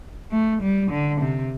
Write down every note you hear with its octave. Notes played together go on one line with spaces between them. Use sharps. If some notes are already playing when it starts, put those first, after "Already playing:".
A3
G3
D3
C3